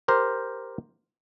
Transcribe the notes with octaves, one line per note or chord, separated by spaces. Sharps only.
G4 A#4 C5